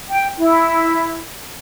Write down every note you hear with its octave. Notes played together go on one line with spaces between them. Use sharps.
G5
E4